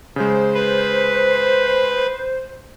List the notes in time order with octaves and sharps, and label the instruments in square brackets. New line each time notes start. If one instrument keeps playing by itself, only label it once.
[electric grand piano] C#3 G#3 [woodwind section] C5
[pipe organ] B4